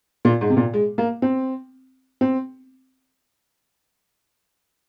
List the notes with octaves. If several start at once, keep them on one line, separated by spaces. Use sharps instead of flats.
A#2
G#2
C3
A#2
G#3
A#3
C4
C4